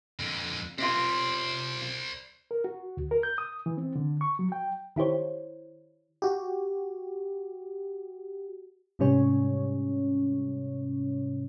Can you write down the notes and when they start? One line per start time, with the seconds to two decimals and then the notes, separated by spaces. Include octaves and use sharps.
0.19 F2 D3
0.79 C3 F4 C5 D5
2.51 A#4
2.64 F#4
2.97 D2
3.11 A#4
3.23 G6
3.38 D#6
3.66 E3
3.77 C4
3.96 D3
4.21 C#6
4.39 F#3
4.52 G5
4.96 D#3 E4 G4 C5 C#5
6.22 F#4 G4
8.99 G#2 C3 G3 C#4 C#5